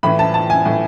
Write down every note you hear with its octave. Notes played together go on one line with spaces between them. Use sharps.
A2 E3 B5
A5
A5
G#5
A2 E3